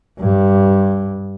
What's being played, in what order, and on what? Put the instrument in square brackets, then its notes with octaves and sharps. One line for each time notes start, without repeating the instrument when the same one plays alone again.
[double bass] G2